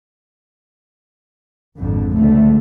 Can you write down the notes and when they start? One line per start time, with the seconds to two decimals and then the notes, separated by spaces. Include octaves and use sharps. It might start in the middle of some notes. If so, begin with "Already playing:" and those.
1.79 G#1 F2 D3
2.15 C#2 D3 A3